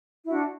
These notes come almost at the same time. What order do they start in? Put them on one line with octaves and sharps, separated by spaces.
E4 F#4 D4